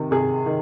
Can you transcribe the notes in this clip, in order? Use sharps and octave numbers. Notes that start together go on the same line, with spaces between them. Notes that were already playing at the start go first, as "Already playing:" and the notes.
Already playing: C3 D#3
C3 G#4
D#3